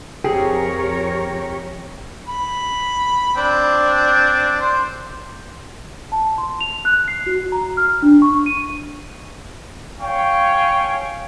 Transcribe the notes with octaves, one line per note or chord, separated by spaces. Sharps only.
F2 G4 G#4 A#4 C#5
B5
C4 D4
C5
A5
C6
F7
F#6
C7
F#4
A#5
F6
D4
C#6
D#7
C#5 F5 G5 G#5 C#6